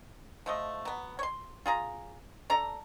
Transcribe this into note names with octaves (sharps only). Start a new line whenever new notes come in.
F3 A3 D#5
F#3 B3
C#5 C6
F4 G#4 A#5
D4 A4 A#5